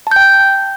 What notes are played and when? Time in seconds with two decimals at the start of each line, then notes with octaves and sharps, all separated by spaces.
0.07 A5
0.11 G6
0.16 G5